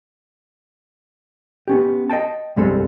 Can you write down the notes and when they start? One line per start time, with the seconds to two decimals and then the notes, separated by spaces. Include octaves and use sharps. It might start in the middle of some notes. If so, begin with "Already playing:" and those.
1.68 B3 C#4 G4
2.10 D#5 F5 G5 A5
2.56 C2 G2 G3 G#3 C4 A4